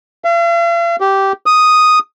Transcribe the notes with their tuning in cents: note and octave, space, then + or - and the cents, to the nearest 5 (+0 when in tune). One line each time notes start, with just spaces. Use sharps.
F5 -45
G4 -10
D#6 +0